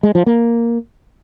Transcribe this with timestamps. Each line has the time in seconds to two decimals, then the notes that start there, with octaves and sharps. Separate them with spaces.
0.03 G#3
0.15 F3
0.26 A#3